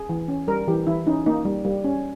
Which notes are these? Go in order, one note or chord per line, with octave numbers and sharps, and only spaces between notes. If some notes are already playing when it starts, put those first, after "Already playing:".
Already playing: G#4
E3
C#4
G3 A#4
E3 G4
E3 E4
C#4 D#4
A#3 D#4
G3
G3
C#4